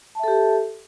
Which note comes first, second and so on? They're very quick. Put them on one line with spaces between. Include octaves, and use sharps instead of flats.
A5 E5 A4 G4